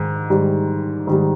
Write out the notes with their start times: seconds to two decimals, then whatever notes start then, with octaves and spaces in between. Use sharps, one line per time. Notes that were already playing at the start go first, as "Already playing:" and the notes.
Already playing: G#2 D#3
0.30 G#2 D#3 G3
1.07 G#2 D#3 G3